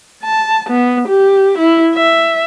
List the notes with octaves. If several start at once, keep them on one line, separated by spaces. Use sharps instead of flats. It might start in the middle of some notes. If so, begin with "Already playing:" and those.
A5
B3
G4
E4
E5